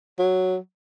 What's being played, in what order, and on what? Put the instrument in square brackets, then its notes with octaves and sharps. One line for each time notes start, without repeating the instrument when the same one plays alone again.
[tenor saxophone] F#3